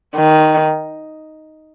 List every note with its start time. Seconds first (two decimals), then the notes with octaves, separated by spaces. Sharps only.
0.15 D#3